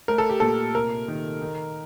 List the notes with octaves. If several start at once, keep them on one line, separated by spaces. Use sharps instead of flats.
A3 A#4
A4
G4
A#2 A4
C3 A#4
D#3
D#3